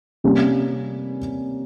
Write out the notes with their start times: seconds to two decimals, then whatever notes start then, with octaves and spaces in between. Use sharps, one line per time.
0.24 C3 G3 A#3 C#4